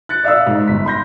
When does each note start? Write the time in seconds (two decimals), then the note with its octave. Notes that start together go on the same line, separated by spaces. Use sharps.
0.09 F#6 A6 C#7
0.24 D5 E5 F5 D#6 E6
0.47 G#2
0.68 G1 B6
0.85 B5 C6 G6 A#6